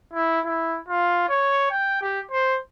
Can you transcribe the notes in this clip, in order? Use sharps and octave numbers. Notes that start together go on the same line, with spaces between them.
E4
E4
F4
C#5
G5
G4
C5